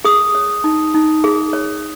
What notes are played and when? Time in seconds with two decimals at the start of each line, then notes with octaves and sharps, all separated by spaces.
0.05 G#4 D#6
0.35 C#5
0.64 D#4
0.94 D#4
1.24 G#4
1.53 C#5